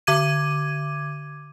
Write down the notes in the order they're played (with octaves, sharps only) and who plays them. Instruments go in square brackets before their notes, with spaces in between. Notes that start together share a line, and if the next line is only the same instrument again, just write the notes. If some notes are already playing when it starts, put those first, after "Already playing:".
[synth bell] D3 D6 G#6 D#7